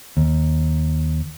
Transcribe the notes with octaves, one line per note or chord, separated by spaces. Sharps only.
D#2